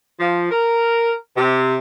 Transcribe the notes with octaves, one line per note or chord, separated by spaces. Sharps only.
F3
A#4
C3